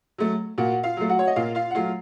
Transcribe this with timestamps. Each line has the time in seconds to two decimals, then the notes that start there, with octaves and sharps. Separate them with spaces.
0.18 F#3 A3
0.58 A#2 F#4 F#5
0.84 F4 F5
0.97 F#3 A3
1.09 F#4 F#5
1.19 C#5
1.27 D#5
1.36 A#2 F4 F5
1.55 F4 F5
1.71 F#5
1.75 F#3 A3 F4 F5